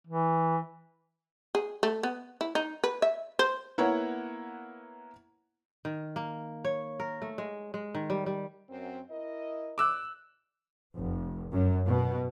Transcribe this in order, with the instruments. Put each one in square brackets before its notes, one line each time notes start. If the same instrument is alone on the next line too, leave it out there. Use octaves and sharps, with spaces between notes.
[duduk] E3
[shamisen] G#4
A3
B3
E4
D#4
B4
E5
C5
[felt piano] A#3 B3 E4 C#5 F#5
[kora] D#3
A#3
C#5
A#4
A3
G#3
G#3
D#3
G3
G3
[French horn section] F#2 C4
E4 A#4 D#5
[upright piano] D6 E6 F#6
[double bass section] F1
F#2
B2